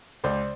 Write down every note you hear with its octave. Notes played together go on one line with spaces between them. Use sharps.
C#2 C5 D5